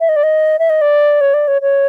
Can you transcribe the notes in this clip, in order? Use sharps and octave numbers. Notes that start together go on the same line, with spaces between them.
E5
D#5
D5
D#5
E5
D#5
D5
C#5
D5
C#5
C#5